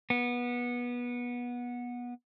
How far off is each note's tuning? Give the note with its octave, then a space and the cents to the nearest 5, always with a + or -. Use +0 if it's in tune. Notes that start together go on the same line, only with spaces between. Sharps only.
B3 -20